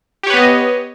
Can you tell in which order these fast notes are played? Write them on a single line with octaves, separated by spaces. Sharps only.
G4 C#5 B4 B3 D#5